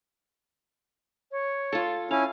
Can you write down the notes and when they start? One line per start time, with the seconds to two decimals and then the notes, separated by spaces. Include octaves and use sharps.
1.32 C#5
1.72 F4 A4
2.11 C#4 E4 F5 G#5